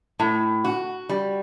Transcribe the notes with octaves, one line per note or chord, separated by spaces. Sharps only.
A2
F#4
G3